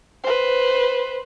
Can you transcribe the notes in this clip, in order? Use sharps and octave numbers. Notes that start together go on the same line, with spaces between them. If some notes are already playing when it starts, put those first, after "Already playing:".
B4 C5